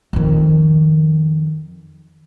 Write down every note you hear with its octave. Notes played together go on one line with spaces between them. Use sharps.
F2 D#3